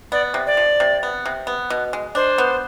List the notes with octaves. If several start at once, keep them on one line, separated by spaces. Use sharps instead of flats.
B3 D5
C3
D5
F3
C3
B3
C3
B3
B2
G#3
D4 C5
B3